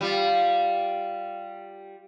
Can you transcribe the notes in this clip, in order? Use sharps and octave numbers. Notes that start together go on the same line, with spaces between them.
G3 F4